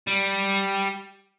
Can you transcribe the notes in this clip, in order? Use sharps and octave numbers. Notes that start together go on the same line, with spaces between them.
G3